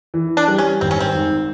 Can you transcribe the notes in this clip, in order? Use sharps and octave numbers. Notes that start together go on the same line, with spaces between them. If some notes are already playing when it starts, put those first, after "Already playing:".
E3
D4
G3
C#4
G#1 C4
C#4
C4
G#2